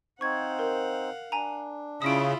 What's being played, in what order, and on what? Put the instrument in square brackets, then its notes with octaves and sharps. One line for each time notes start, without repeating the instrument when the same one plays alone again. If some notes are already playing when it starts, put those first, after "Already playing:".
[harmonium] C4 D#4 C5 [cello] F5 F#5 [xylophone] C#6 G#6
[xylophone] A#4
[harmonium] D4 [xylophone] G#5 A#5
[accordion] C#3 [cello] E4 F4 [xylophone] D#6 D7